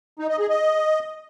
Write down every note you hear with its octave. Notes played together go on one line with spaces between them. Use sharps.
D#4
D#5
G#4
D#5